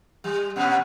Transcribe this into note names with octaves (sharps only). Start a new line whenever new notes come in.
G3
A#2 B3 C#4